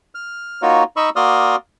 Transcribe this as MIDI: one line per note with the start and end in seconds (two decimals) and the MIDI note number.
0.15 0.62 89
0.62 0.83 58
0.62 0.83 63
0.62 0.83 65
0.62 0.83 66
0.62 0.83 73
0.97 1.09 63
0.97 1.09 75
0.97 1.09 83
0.97 1.09 85
0.97 1.09 88
1.16 1.56 58
1.16 1.56 66
1.16 1.56 74
1.16 1.56 84
1.16 1.56 87
1.16 1.56 89